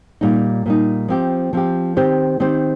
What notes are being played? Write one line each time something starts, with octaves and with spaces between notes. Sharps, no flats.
A#2 G3 D#4
A#2 G3 D#4
F3 C4 G4
F3 C4 G4
D#3 C4 G4 C5
D#3 C4 G4 C5